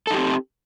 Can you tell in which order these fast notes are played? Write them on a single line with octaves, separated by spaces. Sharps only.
A4 D#4 G4 C4